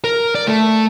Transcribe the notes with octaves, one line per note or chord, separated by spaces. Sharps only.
A#4
D5
A3